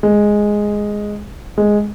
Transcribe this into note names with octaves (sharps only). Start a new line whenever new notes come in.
G#3
G#3